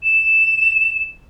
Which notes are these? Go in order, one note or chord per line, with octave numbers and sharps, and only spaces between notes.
E7